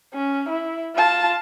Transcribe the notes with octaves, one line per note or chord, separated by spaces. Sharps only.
C#4
E4
F4 A5